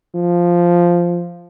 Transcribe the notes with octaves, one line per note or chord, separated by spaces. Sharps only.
F3